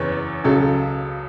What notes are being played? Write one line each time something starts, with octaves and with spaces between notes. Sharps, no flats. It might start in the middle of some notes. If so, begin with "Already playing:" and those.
Already playing: F#1 E2 E3 C#5
C#2 C#3 F#3 A4